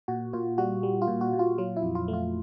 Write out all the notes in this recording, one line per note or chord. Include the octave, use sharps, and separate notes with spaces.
A#2 F#4
A#2 F4
G3 F#4
G3
F4
A#2
F#4
A#2
F4
F#3 F4
E4
F2
F4
A3
F4